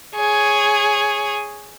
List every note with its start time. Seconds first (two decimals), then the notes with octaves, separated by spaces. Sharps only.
0.15 G#4 C#5